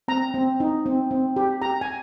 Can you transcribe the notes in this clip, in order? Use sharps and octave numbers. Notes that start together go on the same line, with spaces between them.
C4 A#5
C4
D#4
C4
C4
G4
G4 A#5
G#5